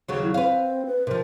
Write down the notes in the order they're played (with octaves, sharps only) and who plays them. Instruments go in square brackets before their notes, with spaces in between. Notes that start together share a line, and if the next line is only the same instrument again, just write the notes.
[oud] D#2 C#3 F#3
[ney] E4
[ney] C4 [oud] B4 F5
[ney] B4
[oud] C3 F3 [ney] A#4